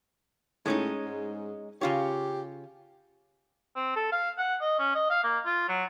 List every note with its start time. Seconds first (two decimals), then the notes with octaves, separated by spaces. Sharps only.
0.66 A2 G#3 C#4 D#4
1.05 G#2
1.81 C#3 F4 G4 C#5
3.76 C4
3.96 A4
4.12 F5
4.38 F#5
4.62 D#5
4.80 C#4
4.95 D#5
5.10 F5
5.24 A#3
5.46 F4
5.69 F#3